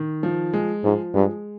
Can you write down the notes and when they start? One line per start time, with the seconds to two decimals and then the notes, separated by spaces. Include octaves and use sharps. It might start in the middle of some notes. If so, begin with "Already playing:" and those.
Already playing: D#3
0.23 F3
0.53 G#3
0.83 G#2 F3
1.14 G2 G#3